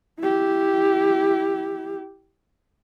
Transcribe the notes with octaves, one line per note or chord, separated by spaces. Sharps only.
E4 G4